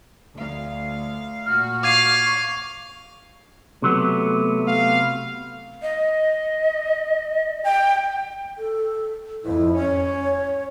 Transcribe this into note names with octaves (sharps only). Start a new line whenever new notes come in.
D2 F5
A#2 F#4 F6
F5 C#6 D6 G#6 D#7
C3 F#3 A3 B3
F5
D#5
G5
A4
F2 E4
C#4 C#5